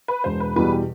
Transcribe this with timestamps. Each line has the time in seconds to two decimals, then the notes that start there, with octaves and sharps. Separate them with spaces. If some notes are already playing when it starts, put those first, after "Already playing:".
0.08 B4
0.24 E1 C5
0.40 B4
0.56 E2 B2 G3 B4
0.72 G4